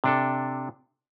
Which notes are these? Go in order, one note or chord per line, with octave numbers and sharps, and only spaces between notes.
C3 D4 A4